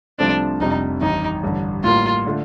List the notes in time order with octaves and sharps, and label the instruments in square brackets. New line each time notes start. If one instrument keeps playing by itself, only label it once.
[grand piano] C2 C3 F3 A3 C4 [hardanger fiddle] D4
[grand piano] F1 F2 C3 G3 [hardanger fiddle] D#4
[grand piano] A1 G2 D#3 [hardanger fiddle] D#4
[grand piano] A1 G2 D3
[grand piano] A2 G3 A#3 [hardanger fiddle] F4
[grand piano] D3 A3 D4 F4